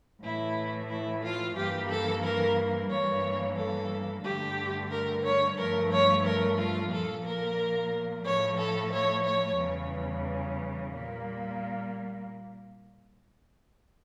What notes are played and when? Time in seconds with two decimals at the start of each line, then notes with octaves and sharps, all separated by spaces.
0.22 A2 E3 A3 E4
0.89 E4
1.22 F4
1.55 G2 E3 A#3 G4
1.89 A4
2.22 A#4
2.89 G2 E3 G3 A#3 C#5
3.56 A4
4.23 G2 D3 A3 G4
4.90 A#4
5.23 C#5
5.56 G2 F3 A3 A#4
5.90 C#5
6.24 A#4
6.57 F4
6.90 A#2 F3 A#3 A4
7.23 A#4
8.24 A2 F3 A3 C#5
8.58 A4
8.91 C#5
9.25 C#5
9.58 E2 C#3 E3 G3
10.92 A#2 G3 A#3